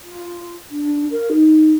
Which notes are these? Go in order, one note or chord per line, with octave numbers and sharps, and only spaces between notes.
F4
D4
A#4
D#4